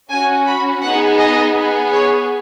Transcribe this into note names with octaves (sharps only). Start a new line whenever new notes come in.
C#4 F#4 G#5
B5
B3 D#4 G#4 F#5
D#5
B3 G#4
C#5